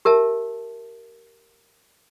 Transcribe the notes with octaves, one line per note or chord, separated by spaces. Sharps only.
G4 A#4 E5 A5